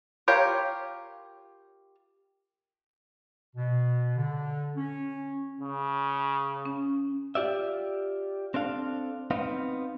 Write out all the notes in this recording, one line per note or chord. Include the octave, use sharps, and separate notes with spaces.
F4 G4 A#4 C#5
B2
D3
C#4
C#3
C#4
F4 G4 D5 E5
C4 D4 A4 F5
B3 C4 D#4 F5